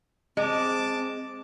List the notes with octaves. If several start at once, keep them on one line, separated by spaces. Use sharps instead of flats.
G#3 C4 D#5 A5 D6